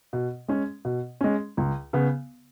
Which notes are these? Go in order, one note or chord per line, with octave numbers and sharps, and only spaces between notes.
B2
G#3 C#4
B2
G#3 C#4
C#2
C#3 B3